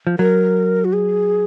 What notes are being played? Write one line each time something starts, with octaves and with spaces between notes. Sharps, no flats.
F3
F#3 A#4
F#4
G#4